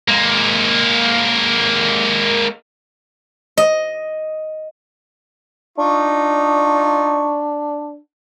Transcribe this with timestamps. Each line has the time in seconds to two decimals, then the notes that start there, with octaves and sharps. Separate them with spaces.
0.08 G#3 A#3
3.58 D#5
5.78 D4 D#4 F4 C#6